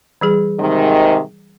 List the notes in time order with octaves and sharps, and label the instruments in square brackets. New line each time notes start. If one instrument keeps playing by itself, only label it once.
[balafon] E3 G3 G#4
[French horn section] G#2 C3 D#3